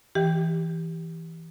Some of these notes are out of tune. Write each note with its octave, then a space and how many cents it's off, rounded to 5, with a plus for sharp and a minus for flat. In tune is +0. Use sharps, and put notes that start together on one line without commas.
E3 -5 G4 +0 G5 +0